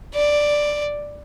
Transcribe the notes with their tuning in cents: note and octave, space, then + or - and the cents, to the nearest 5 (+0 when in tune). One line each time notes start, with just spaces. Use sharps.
D5 +5